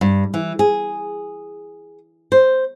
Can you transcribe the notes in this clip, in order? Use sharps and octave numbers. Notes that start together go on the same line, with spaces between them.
G2
E3
G#4
C5